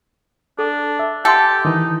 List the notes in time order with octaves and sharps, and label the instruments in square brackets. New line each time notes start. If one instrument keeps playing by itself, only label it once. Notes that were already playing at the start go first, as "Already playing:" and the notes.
[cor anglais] D4 [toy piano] A4
[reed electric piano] E5
[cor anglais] G4 [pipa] A4 [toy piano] F#5 G#5 C6
[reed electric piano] D#3 E3 [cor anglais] D#4